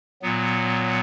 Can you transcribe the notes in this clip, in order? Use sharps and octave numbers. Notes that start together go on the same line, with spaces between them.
A#2 F#3 B3